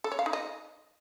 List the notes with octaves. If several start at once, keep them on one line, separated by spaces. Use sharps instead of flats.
A4
C#5
F5
D#4
D#5